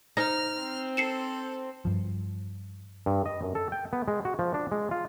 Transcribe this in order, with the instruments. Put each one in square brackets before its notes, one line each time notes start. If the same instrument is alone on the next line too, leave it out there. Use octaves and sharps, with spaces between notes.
[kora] D#4 [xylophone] C5 A#6 [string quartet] F6
[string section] C4
[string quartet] A4 [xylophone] C7 C#7 E7
[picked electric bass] G2 F3
[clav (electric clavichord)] G2
D#5
F#2
A4
G5
B3
G#3
F#4
F3
D4
G#3
F4